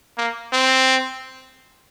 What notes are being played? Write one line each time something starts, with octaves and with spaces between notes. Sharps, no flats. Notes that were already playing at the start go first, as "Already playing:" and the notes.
A#3
C4